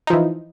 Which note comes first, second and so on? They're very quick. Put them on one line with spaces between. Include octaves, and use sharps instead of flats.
D#4 F3 E3